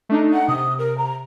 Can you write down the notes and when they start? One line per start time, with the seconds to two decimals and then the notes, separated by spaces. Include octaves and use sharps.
0.09 A3 D4 D#4
0.33 F#5
0.48 C3 D#6
0.78 A#4
0.98 A#5